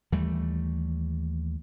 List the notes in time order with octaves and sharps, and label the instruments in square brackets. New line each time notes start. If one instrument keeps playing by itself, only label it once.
[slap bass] D#2 E3 G3 A3